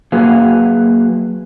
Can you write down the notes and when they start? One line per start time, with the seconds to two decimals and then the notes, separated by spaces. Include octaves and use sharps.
0.12 F#3 A#3 F#4 G#4 B4 F5